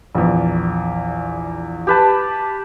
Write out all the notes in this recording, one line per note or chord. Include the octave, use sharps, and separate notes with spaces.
A#1 E2
G4 B4 A5